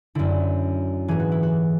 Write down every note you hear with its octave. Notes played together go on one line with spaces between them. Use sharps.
F#2 D3 E4
G#2 E3 G#4
F#4
E4
F#4